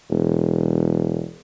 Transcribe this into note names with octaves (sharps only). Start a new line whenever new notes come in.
E1